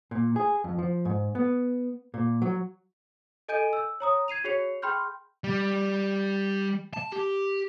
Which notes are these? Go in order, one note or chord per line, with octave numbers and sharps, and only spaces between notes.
A#2
G#4
F2
F3
G#2
B3
A#2
F#3
A4 D#5 G#5 G6 D7 D#7
E6
C#5 A#5 D#6
G#6 C7 D#7 F7
F#4 G#4 C#5 C7 C#7 F7
G#4 G5 B5 C6 F6 G6
G3
A5
G4